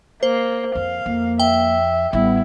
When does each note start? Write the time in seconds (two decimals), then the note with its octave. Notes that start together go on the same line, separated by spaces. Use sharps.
0.23 A#3 C5
0.75 F2 F5
1.06 F2 A#3
1.40 E5 G5
2.13 A1 G3 B3 E4